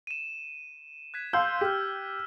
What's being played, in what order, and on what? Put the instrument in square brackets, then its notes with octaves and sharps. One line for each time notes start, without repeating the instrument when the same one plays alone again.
[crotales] D#7 E7
F#6 G#6 B6
[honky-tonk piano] F5 C6 G6 [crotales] E6
[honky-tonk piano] G4 [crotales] F6 B6